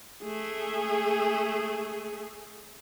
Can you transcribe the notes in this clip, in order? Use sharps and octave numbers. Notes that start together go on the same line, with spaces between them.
A3 G#4